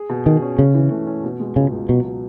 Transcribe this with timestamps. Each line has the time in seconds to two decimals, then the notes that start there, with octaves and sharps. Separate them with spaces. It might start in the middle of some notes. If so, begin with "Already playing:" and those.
Already playing: G#4
0.09 B2
0.26 D#3 G#4
0.42 C#4
0.58 C#3 C#4
0.74 E3
0.91 A3
1.07 C#4
1.24 B2
1.40 G#3
1.56 C#2 C#3
1.72 C#2
1.89 B2 F#3
2.04 B2